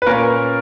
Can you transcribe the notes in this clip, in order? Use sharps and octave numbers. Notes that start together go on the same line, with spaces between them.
B4
A#2 A#3 C#4 A#4